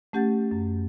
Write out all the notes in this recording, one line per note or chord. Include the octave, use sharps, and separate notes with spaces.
A3 C#4 G4 F#5 G6 A6
F#2